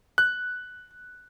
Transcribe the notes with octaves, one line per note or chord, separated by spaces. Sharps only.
F#6